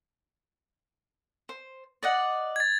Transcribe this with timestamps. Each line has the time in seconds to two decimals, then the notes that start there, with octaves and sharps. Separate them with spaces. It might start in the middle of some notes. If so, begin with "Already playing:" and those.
1.49 C5
2.03 D5 D#5 F#5
2.56 G#6 A6